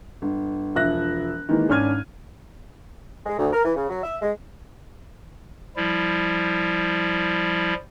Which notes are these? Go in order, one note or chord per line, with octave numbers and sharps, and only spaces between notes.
G1
E1 F3 E5 F#6 A#6
D#3 E3 G#3 A#3
G#1 C#4 D4 F6 G#6 D#7
G#3
D2
A#4
E3
C#3
F#3
E5
G#3
F3 G3 E4